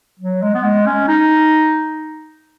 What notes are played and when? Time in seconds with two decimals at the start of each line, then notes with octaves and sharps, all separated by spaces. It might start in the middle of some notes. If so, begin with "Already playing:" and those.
0.20 F#3
0.42 G#3
0.54 B3
0.64 G#3
0.86 C#4
1.08 D#4